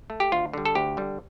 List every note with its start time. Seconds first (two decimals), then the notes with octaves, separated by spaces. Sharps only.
0.10 A3
0.20 G4
0.32 D2 F4
0.53 D3 G3
0.65 A4
0.75 D2 G4
0.97 D3 G3